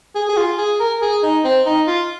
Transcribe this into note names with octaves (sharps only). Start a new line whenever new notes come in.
G#4
G#4
F4
G#4
A#4
G#4
D#4
C4
D#4
F4